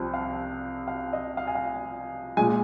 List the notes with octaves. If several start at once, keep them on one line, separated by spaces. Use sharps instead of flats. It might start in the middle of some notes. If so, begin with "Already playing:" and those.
Already playing: C2 C3 F3 C4
F5
F5
D#5
F5
G#5
F5
A#2 G#3 G#5